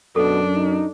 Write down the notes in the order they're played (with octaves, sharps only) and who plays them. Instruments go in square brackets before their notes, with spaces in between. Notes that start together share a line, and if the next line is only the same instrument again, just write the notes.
[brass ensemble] F#2 [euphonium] B2 [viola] D4 [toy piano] A4
[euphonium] D#4